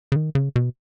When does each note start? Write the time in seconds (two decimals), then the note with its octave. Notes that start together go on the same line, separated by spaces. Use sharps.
0.12 C#3
0.16 D#3
0.35 C#3
0.56 B2